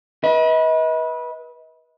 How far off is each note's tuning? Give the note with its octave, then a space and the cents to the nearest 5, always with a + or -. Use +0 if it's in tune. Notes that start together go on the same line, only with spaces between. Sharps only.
B4 -25 D#5 +40